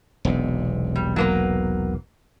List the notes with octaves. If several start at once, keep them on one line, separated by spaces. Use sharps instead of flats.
E1 B1 C3
G3
F#3 A#3 B4